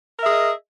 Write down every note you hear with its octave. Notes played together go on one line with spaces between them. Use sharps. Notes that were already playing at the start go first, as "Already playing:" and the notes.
G#4 A#4 D#5 E5